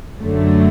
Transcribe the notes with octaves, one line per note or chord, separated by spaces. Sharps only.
F#2 D3 F#3 A3